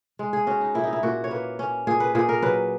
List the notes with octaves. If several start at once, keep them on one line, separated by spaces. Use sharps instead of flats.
G#3
G#4
C#4 F#4
D#4
A#2 E4
D#4
E4
A#2 F#4
C#5
A#3 B4
C#4
A#2 G#4
B4
A#2 G#4
A#4
F#3 B4